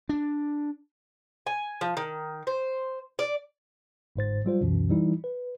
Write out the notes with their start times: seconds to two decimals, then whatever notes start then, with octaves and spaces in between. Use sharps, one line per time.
0.09 D4
1.47 G#5
1.81 F3
1.97 D#3
2.47 C5
3.19 D5
4.16 G1 G#2 C5 A6
4.45 F#3 G3 F4 C5
4.61 C#2 F#2 B2 E3
4.89 E3 G3 D#4 E4
5.24 B4